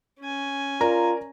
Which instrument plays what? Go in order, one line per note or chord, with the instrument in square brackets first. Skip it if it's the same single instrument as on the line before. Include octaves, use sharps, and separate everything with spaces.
[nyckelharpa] C#4 G#5
[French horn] F4 [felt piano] A#4 D5 [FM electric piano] A#5